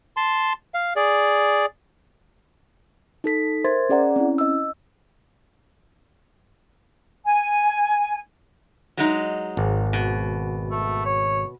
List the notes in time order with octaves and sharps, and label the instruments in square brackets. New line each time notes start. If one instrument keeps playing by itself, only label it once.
[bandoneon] A5 C6
F5
G#4 D5
[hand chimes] D#4 A4 B6
A#4 C5 E5 C6 G#6 A6
C#4 G#4 D5 F#5 A#5
C4 C#4 E4
D#5 E6
[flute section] G#5
[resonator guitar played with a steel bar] F#3 G#3 D#4
[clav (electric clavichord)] G#1
[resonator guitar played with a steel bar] B2
[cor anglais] A3
C#5